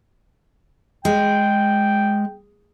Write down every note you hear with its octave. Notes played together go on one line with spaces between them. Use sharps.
G#3 G5